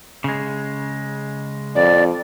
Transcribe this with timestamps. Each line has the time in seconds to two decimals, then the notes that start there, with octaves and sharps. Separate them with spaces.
0.24 C#3 G#3
1.75 F2 D5